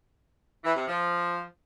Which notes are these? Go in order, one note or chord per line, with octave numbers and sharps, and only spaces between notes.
E3
C3
F3